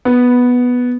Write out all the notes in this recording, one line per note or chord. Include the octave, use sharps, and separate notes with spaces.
B3